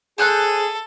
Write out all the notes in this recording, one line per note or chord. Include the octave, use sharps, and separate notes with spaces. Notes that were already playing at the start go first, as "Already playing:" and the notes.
G#4 A4 C5 F6 F#6